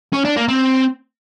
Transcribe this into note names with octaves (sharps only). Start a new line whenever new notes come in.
C#4
D4
A#3
C4